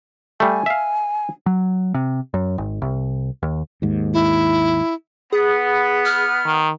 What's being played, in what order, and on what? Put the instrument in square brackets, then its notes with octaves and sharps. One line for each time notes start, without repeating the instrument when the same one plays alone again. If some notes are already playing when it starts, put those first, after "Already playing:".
[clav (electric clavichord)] G3 A3 [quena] G#5
[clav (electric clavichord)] E5 F5
[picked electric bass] F#3
C3
F#2
G#1
C2
D#2
[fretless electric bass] D#2 G#2
[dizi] E4
[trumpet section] B3 [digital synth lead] G#4
[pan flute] F6
[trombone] D#3